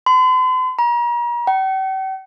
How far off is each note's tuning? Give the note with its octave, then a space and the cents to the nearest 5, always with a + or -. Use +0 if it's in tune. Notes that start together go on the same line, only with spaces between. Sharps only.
C6 -45
A#5 +40
G5 -45